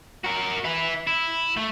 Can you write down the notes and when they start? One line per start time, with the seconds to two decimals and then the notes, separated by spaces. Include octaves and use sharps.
0.25 F#4 A#4
0.64 E4 B4
1.07 E4
1.57 A3